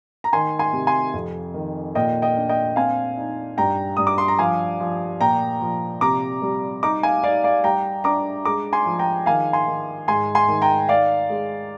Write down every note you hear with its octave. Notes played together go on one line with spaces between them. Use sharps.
A#5
D#3 G#5 C6
G#5 C6
C3
G#5 C6
F2
D#3
A#2 D#5 G5
D#5 G5
D4
D#5 G5
C4 F5 G#5
D#4
G2 G5 A#5
G2 D#6
D6
C6
A#5
F3 F5 G#5
F3
A#2 G5 A#5
F3
C3 A#5 D6
G3
D#4 A#5 D6
F5 G#5
D#4 D5 F5
D5 F5
G3 G5 A#5
D4 A#5 D6
G#3 A#5 D6
G#5 C6
F3
G5 A#5
D#3 F5 G#5
G#5 C6
D#3
G#2 G#5 C6
G#5 C6
D#3
G5 A#5
D#4 D5 F5
G#3